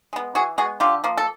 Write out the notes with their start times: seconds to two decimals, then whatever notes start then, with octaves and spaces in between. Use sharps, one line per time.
0.13 G#3 B3
0.35 E3 F#4 G#4
0.58 G#3 B3 F#4 G#4
0.80 D3 F4 G4
1.04 F3 A#3
1.18 A4